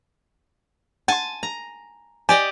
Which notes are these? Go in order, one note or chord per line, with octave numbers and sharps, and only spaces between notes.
F#5 G#5 A5 C6
A#5
G4 D5 D#5 G#5